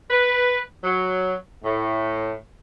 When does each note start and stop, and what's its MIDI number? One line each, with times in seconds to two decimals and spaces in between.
0.10 0.59 71
0.84 1.35 54
1.63 2.33 45